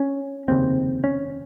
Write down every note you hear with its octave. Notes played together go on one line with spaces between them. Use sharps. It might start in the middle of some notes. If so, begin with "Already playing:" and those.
Already playing: C#4
F1 D#2 C#3 C4
C#4